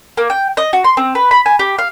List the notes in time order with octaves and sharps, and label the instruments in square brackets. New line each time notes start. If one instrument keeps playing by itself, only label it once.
[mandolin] A#3
G5
D#5
F#4
C6
C4
B4
B5
G#5
G4
F5